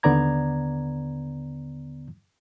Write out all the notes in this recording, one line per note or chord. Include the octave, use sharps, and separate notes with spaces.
D#2 D3 B3 D5 A#5 G#6